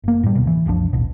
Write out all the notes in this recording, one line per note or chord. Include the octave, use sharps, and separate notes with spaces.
F#1 A#3
A2 G3
D2 B2
E3
F#1 C2 F3 D4
D#1 A1 B2